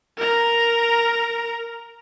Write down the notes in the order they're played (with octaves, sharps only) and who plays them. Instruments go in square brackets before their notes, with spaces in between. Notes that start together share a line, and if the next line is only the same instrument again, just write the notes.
[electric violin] A#4 A#5